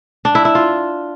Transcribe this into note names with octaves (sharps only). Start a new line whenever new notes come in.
D4
E4
E4
F4